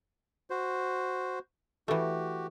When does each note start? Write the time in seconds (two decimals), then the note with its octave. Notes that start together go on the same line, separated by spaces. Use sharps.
0.50 F#4 C5
1.88 E3 A3 F#4 G4